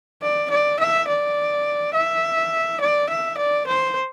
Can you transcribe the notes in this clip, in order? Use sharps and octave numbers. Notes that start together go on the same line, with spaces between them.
D5
D5
E5
D5
E5
D5
E5
D5
C5